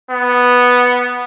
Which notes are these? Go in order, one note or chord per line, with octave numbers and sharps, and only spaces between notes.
B3